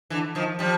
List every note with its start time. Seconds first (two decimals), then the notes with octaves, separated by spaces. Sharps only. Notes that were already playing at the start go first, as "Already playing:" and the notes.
0.10 D3 E3
0.35 D#3 F3
0.59 F3 G3